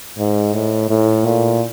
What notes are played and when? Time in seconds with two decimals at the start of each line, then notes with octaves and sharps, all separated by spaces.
0.18 G#2
0.54 A2
0.89 A2
1.25 A#2